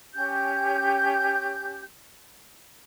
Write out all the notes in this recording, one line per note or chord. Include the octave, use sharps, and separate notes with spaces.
C#4 G4 G6